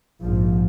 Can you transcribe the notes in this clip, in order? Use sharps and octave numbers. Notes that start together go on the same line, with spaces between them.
A#1 G#2 F3